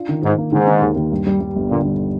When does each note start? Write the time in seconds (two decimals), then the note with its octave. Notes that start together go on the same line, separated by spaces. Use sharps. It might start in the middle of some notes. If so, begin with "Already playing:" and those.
Already playing: D4 F4
0.09 D#3
0.22 G#2 D#3
0.38 A#3
0.52 G#2 D#3
0.67 D#3
0.82 D#2
0.96 D#2
1.12 G2
1.27 G3
1.41 G3
1.56 G1
1.70 A#2 D3
1.85 G3